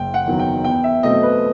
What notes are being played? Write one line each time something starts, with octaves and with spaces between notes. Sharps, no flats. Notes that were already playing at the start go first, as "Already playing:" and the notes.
Already playing: F#1 G5
F#5
E2 D#3 F#3
G5
E2 G5
E5
B2 F#3 A3 C4 D#5
B4